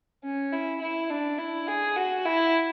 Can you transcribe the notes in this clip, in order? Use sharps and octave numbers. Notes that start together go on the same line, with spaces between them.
C#4
E4
E4
D4
E4
G#4
F#4
E4